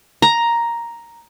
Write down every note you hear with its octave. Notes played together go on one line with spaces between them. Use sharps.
A#5